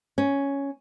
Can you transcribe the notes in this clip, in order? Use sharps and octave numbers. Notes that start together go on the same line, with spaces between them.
C#4